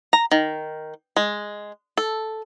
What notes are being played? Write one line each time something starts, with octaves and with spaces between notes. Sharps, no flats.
A#5
D#3
G#3
A4